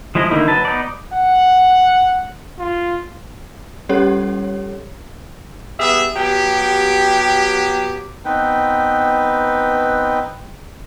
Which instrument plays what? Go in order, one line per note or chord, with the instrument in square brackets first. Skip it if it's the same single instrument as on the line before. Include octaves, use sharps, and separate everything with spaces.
[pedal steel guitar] F3 G#3 E4 D#5
D3 D#3 A#3 D#4 E4
F#3 B4 A5
B3 D#4 D5
[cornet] F#5
F4
[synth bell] G3 C#4 G4 A4 C#5
[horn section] G3 B3 G#4 E5
F#3 B3 G4
[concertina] B3 C4 D#4 B4 G5